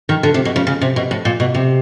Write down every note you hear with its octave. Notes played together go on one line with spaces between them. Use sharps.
D#3
D3
C3
B2
C#3
C#3
C3
B2
A2
A#2
B2
C3